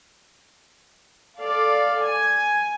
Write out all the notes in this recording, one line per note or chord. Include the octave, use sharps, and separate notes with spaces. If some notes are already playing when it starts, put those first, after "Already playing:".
A4 D5 F5
G#5